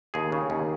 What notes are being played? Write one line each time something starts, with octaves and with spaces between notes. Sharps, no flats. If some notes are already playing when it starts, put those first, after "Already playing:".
D#2 G#4
C#3
D#2